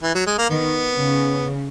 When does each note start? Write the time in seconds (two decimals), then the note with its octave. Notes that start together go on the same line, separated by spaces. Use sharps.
0.03 E3
0.15 F#3
0.27 G#3
0.38 A#3
0.50 D#3 B3
0.96 C#3